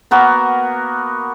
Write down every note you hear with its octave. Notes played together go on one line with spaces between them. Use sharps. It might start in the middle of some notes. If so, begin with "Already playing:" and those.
A#3 B3 F#4 A#4